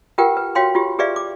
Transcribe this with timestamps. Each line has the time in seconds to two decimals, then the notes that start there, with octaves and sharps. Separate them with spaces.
0.18 F4 G4 A#4 B4 F#5 G5
0.37 B4
0.55 F#4 C#5 F5 G5 C6
0.75 F4 G4
0.99 G4 G#4 B4 D5 E5 F5
1.16 D6